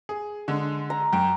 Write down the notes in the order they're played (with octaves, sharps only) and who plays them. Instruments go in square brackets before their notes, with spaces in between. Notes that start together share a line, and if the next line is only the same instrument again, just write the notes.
[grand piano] G#4
D3 G#3
[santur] A#5
[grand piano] F#2 G5